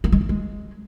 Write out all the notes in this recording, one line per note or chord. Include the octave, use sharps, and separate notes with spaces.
A#3
G#3
A#3
G#3